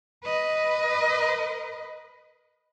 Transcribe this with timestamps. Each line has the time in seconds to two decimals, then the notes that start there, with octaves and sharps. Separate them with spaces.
0.24 B4 D#5